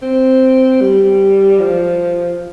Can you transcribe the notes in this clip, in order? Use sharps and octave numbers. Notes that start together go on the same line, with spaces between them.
C4
G3
F3